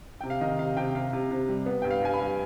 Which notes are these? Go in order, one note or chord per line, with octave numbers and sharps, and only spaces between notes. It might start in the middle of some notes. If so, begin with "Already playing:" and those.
C3 G5
F5
D#3 D#5
C3 F5
C3 G5
C3 F5
C3
C3
G3
B3
G2 G5
F5
G2 G#5
B5
G2